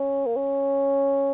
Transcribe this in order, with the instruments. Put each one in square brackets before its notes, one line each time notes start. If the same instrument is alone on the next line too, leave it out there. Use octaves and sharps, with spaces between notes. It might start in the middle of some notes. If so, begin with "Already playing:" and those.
Already playing: [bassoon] C#4
A#3
C#4